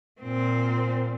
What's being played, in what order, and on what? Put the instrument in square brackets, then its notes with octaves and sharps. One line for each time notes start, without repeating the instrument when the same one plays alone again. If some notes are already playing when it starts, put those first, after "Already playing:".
[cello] A#2 C4